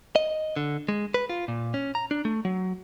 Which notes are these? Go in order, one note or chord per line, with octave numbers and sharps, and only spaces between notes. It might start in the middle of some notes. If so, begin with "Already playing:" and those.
D#5
D3
G#3
B4
F4
A#2
C#4
A#5
D4
A3
F#3